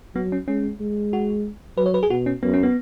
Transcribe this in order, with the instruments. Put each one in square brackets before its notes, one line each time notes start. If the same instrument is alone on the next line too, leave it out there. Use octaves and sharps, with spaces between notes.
[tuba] F#3 [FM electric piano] B3
[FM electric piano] C#4
[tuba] G#3 [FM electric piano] C#4
[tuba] G#3
[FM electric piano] F#4
[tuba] F#3 [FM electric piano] B4
[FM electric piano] C#5
B4
G#4
[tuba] B2 [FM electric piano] F#4
[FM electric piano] C#4
[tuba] F#2 [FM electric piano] B3
[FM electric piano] C#4
B3